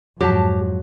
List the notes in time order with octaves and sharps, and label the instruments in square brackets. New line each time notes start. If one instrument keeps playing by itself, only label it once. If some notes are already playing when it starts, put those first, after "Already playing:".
[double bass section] F2 G#2 [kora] F#3 [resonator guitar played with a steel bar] G4 A5